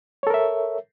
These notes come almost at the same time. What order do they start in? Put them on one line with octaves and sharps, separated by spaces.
C#5 A4 A#4 E5